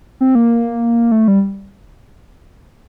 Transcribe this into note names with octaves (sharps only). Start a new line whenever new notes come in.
C4
A#3
A3
G3